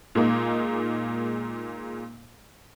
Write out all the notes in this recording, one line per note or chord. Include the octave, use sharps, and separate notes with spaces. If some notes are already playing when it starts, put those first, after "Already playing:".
A#2 G#3 A#3 D#4